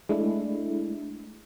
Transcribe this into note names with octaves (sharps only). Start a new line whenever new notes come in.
G#3 A3 D4 E4